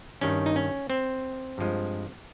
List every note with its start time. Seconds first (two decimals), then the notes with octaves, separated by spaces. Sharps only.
0.21 G2 D#3 G3 C#4
0.46 D#4
0.56 C#4
0.90 C4
1.58 G2 F3 G#3